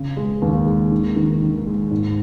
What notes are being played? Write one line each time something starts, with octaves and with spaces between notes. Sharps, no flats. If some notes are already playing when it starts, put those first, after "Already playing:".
Already playing: C#3
G#3
D#2
G#3
D#3
D#3
D#3
G#3
G#2